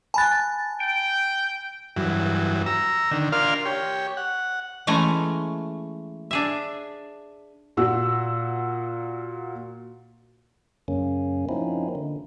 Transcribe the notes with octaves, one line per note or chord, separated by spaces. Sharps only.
G#5 A5 B5 F#6 A6
G5 D7
G2 E3 F#3
A#5 E6
D3 D#3
D4 F4 A#4 F5 C6 F6
G4 C#5
F#5
E3 G#3 A3 C#4 G#5 A#5
D4 G#4 E5
A#2 F#4 E6
F#2 C#3 A#3 C#4
F3 A#3 C4 C#4 D#4 E4
D3